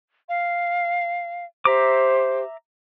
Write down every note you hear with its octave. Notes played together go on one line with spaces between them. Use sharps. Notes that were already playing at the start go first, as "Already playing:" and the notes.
F5
G4 C5 E5 A#5 D6